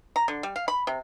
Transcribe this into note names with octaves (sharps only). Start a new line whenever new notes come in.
A#5
D3
G3
F5
B5
C3